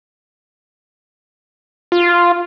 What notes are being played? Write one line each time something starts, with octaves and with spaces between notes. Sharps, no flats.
F4